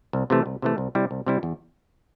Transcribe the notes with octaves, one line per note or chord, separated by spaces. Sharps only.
C2
C3 E3 A3
C2
C3 E3 A3
C2
C3 G3 E4
C2
C3 G3 E4
E2